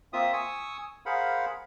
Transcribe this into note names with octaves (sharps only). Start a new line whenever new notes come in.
A#3 C4 F4 E5 D#6
G#5 C#6 D#6 E6
G#4 A#4 C5 F5 F#5 B5